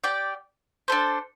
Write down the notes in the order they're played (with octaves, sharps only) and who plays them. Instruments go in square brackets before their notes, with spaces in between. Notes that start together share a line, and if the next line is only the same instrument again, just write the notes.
[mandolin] G4 D5 G5
D4 A4 C5